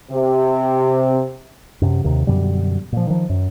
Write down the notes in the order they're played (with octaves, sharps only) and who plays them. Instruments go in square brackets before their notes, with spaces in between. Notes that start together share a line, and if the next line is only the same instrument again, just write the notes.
[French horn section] C3
[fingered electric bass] F#2 C3
D#2 C3 D#3
F#2 B2 D3 G3
A#2 F3
D#3 F3
F#2